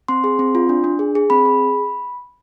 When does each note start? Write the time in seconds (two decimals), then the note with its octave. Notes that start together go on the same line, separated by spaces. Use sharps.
0.08 C4 C6
0.24 G#4
0.39 C4
0.55 F4
0.69 D4
0.84 D4
0.99 G#4
1.15 G#4
1.30 C4 B5
1.45 G#4